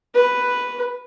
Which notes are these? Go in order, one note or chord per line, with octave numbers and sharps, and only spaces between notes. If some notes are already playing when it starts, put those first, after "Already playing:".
B4